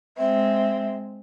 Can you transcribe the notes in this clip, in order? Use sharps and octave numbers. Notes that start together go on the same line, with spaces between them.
G#3 C4 E5